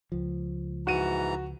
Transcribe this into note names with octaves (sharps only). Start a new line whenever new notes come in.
C#2 F3
G#2 E3 F#4 A#5 D#7